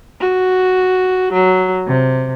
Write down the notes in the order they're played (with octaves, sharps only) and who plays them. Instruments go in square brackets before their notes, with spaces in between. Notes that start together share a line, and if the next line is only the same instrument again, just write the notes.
[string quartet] F#4
F#3
C3